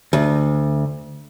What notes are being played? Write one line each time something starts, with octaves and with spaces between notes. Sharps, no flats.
D2